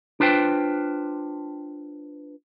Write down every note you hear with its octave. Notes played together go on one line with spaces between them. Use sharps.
D4 F4 B4 C5 G5